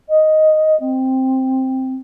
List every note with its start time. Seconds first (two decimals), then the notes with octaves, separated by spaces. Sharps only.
0.08 D#5
0.79 C4